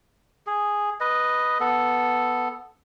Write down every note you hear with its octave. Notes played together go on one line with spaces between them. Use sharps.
G#4
B4 D#5
B3 A4